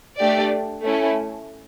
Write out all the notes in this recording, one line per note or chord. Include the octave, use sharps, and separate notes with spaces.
A3 D4 G4 D5
A3 C#4 E4